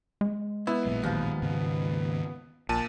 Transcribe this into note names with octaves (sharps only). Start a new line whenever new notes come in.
G#3
B3 E4
A1 A#2 F#3
D#2 F3
G#2 C#3 A#3
A#1 A#2 A5 D#7